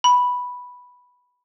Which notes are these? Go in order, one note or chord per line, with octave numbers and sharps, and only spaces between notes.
B5